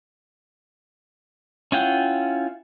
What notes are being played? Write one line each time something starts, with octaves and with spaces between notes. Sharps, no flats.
C#4 E4 F4 F#5 G5